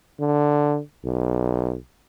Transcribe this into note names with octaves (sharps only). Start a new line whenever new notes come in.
D3
B1